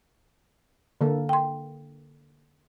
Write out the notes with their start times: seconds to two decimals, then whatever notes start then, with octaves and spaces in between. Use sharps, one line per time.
1.01 D3 A#3 A4
1.29 G5 C6